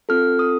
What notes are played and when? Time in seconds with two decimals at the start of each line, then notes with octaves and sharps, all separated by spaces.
0.09 C4 F4 A4 F6
0.39 D#6